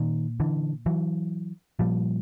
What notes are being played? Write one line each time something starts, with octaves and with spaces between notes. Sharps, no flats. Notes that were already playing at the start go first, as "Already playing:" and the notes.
Already playing: A#2 D#3
D3 E3
E3 F#3
A#2 F3 G3